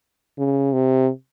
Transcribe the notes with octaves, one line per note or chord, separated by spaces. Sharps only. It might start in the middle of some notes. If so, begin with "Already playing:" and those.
C#3
C3